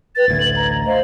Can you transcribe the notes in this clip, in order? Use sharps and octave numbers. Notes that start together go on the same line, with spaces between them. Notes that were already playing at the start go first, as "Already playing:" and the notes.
B4 A6
A1 D2 G#6
F#7
A#5
C5 D#5 F5